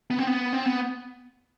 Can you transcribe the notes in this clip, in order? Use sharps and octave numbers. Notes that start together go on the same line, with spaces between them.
B3
C4
B3
C4
B3